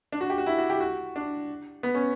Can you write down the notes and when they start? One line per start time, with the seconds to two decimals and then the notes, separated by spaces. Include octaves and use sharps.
0.12 D4
0.21 F#4
0.30 G4
0.38 F#4
0.46 E4
0.58 F#4
0.70 G4
0.80 F#4
1.16 D4
1.83 B3
1.95 C#4